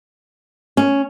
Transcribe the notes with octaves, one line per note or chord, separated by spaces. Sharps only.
C#4